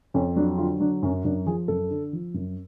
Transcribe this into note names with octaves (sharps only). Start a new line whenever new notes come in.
F2 C#4
F#3 D4
D3 F4
F#3 D4
F#2 C#4
F#2 D4
F3 G#4
F#2 A4
D3
F3
F#2